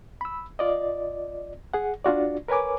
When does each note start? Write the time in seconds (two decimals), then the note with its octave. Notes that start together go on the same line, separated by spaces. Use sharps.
0.21 B5 E6
0.59 F4 D5 D#5
1.74 G#4 F#5
2.04 D4 F4 F#4 D5
2.48 A#4 B4 C#5 G#5 D6